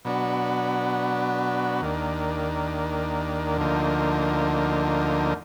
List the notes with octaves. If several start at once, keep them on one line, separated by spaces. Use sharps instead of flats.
B2 F#3 B3 D4 F#4
D#2 D#3 A#3 D4
D2 D3 F3 A#3 D#4